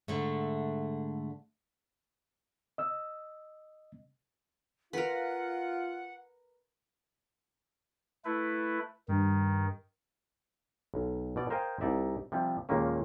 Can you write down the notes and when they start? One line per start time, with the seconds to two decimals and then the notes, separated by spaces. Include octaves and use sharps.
0.08 G#2 D3 A3
2.78 D#5 E6
4.93 F4 A#4 B4 F#5
8.25 A3 E4 B4
9.08 G2 D#3
10.94 B1
11.36 B2 D5
11.50 A#4 C5 D#5 F5 G5 G#5
11.81 C2 D#4 D5 E5
12.32 C3 F3 G3
12.69 D#2 A#2 D#3 G#3 A#3 C#4